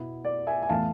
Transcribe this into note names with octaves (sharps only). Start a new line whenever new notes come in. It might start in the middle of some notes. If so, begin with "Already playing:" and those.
Already playing: B2 B3 E4
D5
E5 G#5
G#5
A2 E3 B3 E4 F5 A5